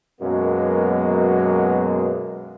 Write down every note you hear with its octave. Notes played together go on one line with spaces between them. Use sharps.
F#2 B2 F#3 G#3 A#3 B3